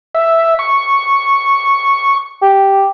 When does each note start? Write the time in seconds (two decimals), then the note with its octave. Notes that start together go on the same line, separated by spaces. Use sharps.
0.15 E5
0.59 C#6
2.42 G4